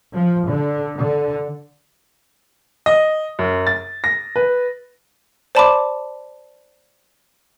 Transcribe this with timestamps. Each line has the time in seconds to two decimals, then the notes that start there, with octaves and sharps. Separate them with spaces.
0.13 F3
0.47 D3
0.96 D3
2.86 D#5
3.39 F#2
3.67 A6
4.04 A#6
4.36 B4
5.55 C5 D5 A5 B5 C6 D6